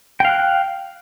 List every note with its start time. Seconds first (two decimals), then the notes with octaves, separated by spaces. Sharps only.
0.20 G5
0.25 F5
0.29 F#6